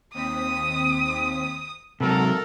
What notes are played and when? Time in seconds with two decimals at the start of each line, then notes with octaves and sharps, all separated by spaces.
0.14 D#2 C4 D#6 B6
2.00 C3 F#3 A4 A#4 F#5 A5